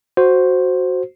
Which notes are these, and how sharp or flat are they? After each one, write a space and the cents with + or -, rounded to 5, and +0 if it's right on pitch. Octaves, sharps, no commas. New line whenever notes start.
F#4 +0 C5 +0